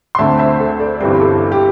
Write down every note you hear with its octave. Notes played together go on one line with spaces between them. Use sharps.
C6
D2 D3 C4 E5 A5
C5 E5
C5
A4
A4 D5
G1 G2 E3 G3 C4 G4 C5
A4
G4